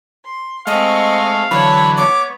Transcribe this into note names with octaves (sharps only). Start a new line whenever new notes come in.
C6
G#3 A3 C4 D#5 F5 C#6
D3 E3 F#3 C#5 A5 B5
B3 C#5 D6